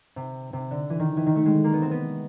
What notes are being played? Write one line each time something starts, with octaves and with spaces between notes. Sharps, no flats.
C3
C3
D3
E3
D#3
E3
D#3
A3
G#3
A#3
B3
C4
B3